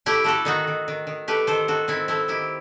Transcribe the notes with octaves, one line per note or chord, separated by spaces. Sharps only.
A3 E4 G4
A3 F#4 A4
D#3 D#4 F#4
D#3
D#3
D#3
A3 G4 B4
D#3 A4 C5
D#3 F#4 A4
D#3 C4 E4
A3 C4 E4
D#3 E4 G4